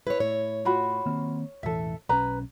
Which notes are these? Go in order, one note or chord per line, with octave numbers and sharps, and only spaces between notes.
E4 B4 C#5
A2 C#5
F4 F#4 B5
D#3 A#3 C4
E1 A1 E3 A4 E5
B1 C#4 B4 A#5